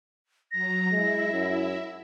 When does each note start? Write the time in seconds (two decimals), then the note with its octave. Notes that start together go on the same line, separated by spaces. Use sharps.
0.52 F#3 A#5 A#6
0.92 G#3 E4 E5
1.33 F#2